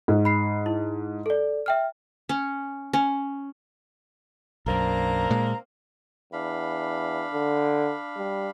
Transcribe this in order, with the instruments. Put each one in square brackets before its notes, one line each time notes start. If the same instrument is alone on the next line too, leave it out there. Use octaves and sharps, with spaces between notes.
[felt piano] G#2
[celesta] B5 C7
E4
A4 D5
E5 G5 F6
[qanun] C#4
C#4
[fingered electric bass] B1 F#2 [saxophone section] A#3 C4 D4 [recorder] A#5
[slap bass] A#2 G#3
[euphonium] E2 [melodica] D4 F5 B5
[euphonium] D3
G3